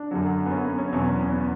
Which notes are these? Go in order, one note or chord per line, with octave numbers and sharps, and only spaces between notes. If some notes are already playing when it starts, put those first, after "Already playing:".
Already playing: D4
F#2 D3 F#3
B3
C#4
B3
C#4
E2 B2 F#3 C#4
B3
C#4
B3